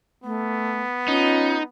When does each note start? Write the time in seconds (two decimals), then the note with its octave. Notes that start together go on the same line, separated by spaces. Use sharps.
0.24 A3 B3
1.08 C#4 D#4 F4